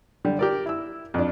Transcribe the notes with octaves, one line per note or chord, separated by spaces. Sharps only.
D3 G3
G4 A#4 D5
E4 E6
F2 D4